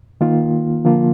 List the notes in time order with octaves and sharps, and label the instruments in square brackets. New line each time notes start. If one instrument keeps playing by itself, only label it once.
[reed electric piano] D#3 A#3 F4
D3 F3 A#3 F4